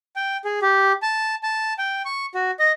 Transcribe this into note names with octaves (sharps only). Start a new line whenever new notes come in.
G5
G#4
G4
A5
A5
G5
C#6
F#4
D#5